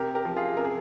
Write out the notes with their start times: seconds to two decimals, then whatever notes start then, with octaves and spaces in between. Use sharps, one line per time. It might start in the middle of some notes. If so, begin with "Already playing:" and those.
Already playing: C3 G4 A#4
0.15 G4 A#4
0.25 F3
0.37 F4 G#4
0.57 C3 A#4
0.65 G#4